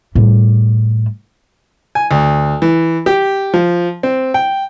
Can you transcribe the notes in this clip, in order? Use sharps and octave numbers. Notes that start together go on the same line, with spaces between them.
A2 G3
G#5
D2
E3
G4
F3
C4
G5